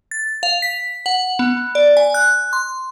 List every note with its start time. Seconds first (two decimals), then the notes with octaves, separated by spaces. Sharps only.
0.11 A6
0.43 F5
0.62 B6
1.06 F#5
1.39 B3
1.75 D5
1.97 G#5
2.14 F#6
2.53 C6